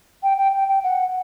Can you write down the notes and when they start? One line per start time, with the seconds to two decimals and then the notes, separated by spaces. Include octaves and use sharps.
0.23 G5
0.37 G5
0.53 G5
0.68 G5
0.84 F#5